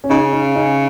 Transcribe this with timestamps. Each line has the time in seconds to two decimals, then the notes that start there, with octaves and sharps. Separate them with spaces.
0.04 C#4
0.10 C#3 D#4
0.33 D#4
0.56 D#4